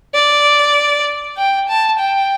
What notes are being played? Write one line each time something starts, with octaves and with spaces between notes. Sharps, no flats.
D5
G5
A5
G5